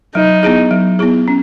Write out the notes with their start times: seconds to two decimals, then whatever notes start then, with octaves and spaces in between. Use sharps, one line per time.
0.15 F#3 D#4
0.43 B3 E4 G#4
0.71 F#3
0.99 B3 E4 G#4
1.28 C#4